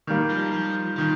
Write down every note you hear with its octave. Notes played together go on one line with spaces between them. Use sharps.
D#3 G3 A#3
F3
F3
D#3 F3